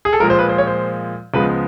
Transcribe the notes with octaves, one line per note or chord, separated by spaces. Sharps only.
G#4
A4
A#2 F3 G#3 A#4
C5
B4
C5
C#5
C5
C#2 C#3 F3 G#3 B3 B4